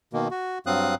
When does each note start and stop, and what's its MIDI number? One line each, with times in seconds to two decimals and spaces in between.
0.13 0.28 47
0.13 0.28 51
0.13 0.28 58
0.31 0.58 66
0.66 0.95 43
0.66 0.95 54
0.66 0.95 60
0.66 0.95 77
0.66 0.95 87
0.66 0.95 90